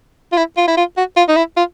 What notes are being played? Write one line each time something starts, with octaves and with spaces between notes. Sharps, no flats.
F4
E4
F4
E4
F4
F#4
F4
D#4
E4
F4